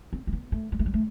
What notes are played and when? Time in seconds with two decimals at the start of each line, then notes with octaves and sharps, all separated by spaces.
0.13 C4
0.27 A3
0.33 B3
0.52 A3
0.72 G3
0.79 A3
0.86 G3
0.94 A3